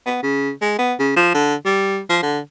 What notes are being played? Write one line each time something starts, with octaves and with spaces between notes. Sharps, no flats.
B3
C#3
G#3
B3
C#3
F3
D3
G3
F3
D3